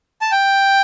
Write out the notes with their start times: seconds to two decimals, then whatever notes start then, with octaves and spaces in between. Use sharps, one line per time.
0.21 A5
0.32 G5